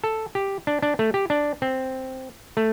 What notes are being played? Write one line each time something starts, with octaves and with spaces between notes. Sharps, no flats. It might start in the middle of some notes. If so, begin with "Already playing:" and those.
A4
G4
D4
D4
A3
G4
D4
C4
A3